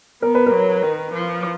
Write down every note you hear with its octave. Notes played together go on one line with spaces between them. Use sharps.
B3 A#4
B4
A#4
F#3
D#3
F3